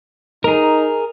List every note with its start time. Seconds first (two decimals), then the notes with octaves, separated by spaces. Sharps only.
0.44 D#4 G#4 A#4